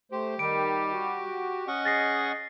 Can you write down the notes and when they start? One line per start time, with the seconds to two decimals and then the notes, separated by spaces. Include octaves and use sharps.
0.12 A3 G4 C5
0.39 D#3 G3 D7
0.93 F#4
1.67 C#4 D#5 F#5 C#6
1.85 G#4 A6 A#6 C7